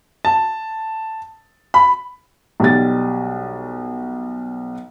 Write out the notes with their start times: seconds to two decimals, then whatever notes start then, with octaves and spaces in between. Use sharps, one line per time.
0.25 A5
1.74 B5
2.60 B1 G3 A6